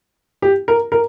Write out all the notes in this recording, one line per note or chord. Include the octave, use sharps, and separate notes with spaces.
G4
A#4
A#4